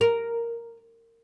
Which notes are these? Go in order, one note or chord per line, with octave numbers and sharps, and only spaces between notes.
A#4